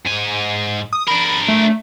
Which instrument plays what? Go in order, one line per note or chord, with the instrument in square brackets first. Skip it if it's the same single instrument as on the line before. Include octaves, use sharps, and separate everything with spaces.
[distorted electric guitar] G#2 G#5
[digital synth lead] D#6
[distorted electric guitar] D4 A#4 [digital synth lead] B5
[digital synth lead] A3